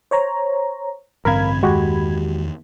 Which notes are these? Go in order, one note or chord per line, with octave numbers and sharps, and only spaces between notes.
C5 C#5 A#5
A1 G2 D3 C4 A#4 F5 B5 G#6
E2 D#3 G#3 F#4 G4